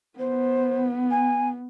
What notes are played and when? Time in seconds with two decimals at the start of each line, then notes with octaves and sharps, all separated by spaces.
0.19 B3 C5
1.11 G#5